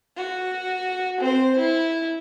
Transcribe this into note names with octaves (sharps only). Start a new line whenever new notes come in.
F#4
C4 C5
E4